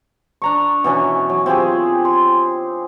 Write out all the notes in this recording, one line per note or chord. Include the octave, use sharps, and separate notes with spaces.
D4 A#5 C#6
B2 E3 C#4
F#3
C4 F4 G4 G#4
C6